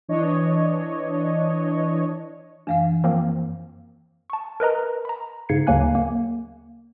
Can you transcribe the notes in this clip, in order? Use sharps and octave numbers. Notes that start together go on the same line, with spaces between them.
E3 D4 C#5 D#5
F#2 E3 D4 F5 F#5
F3 A#3 C4
A5 C#6
A#4 B4 D#5 A#5
A#5 B5
G#2 C#3 G#6 C7 C#7
D2 C#3 F#3 A#3 G#5 F#6
A#3